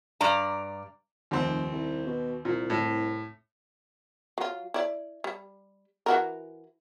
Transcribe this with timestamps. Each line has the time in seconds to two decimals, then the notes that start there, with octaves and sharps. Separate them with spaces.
0.21 G2 D5 A#5
1.31 F1 D#2 C4
1.72 C2
2.06 B2
2.45 C2 A#2
2.70 A2
4.38 F#3 F4
4.74 E4 D5
5.24 G3
6.06 E3 F#4 A#4